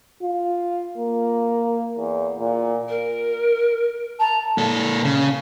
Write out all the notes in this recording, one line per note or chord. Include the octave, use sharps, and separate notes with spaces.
F4
A#3
E2
A#2
A#4
A5 A#5
A#2 A4
C#3